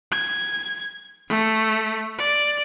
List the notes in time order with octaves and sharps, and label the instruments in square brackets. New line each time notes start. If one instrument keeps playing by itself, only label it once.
[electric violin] G#6
A3
D5